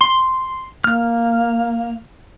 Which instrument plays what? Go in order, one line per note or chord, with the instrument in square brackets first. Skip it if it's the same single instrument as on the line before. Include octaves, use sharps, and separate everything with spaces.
[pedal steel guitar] C6
[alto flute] A#3 [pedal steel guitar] F6